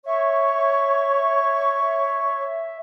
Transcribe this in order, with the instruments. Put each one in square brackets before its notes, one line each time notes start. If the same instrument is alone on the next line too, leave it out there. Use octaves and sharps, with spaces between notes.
[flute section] C#5 C#6 [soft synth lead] E5